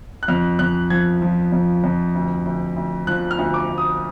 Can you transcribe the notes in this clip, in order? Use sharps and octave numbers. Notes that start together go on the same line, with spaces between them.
F#6
F2 F6
F2 F#6
F3 G#6
F3
F2
F2
D2
D2
D2
F3 F#6
F6
D2
D6
D2
D#6